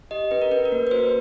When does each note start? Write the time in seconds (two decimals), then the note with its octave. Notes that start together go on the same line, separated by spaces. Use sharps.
0.11 G4 D#5
0.31 C#4 B4
0.41 A#4
0.51 C#4 B4
0.65 A#4
0.72 A#3
0.87 B4
0.91 F#4 C5